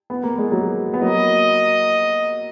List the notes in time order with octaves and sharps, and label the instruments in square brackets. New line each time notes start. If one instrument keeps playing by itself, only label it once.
[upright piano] B3
A#3
G#3
F#3 A#3
B3
[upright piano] F#3 A#3 [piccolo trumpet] D#5